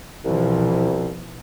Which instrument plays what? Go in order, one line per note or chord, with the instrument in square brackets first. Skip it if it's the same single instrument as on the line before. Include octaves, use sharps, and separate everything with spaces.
[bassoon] C2 [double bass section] B2 E3 F3